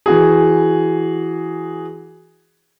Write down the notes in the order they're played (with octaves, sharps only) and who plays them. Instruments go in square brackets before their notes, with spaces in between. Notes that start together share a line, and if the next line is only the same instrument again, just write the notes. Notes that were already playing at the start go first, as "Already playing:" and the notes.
[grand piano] E3 F#4 G#4